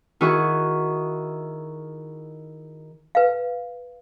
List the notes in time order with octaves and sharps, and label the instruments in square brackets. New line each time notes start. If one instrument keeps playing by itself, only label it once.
[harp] D#3 E4 F#4 G#4 C#6
[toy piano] B4 F5